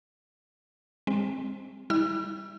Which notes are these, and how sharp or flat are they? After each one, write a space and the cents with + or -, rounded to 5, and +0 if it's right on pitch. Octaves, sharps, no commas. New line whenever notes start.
G#3 -45 C4 +5
G3 +5 E4 -35 E6 +40